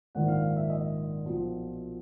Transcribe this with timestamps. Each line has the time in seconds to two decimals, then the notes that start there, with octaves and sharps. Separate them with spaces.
0.15 A#1 G#2 D#3 F#5
0.28 F5
0.56 E5
0.70 D#5
1.25 B1 A#2 F3